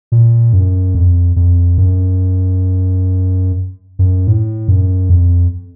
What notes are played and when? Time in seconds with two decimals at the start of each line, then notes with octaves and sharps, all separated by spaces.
0.12 A#2
0.53 F#2
0.95 F2
1.36 F2
1.78 F#2
3.99 F#2
4.27 A2
4.68 F#2
5.10 F2